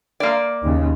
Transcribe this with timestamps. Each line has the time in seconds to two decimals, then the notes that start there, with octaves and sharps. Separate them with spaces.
0.20 A#3 D5
0.63 D#2 C#3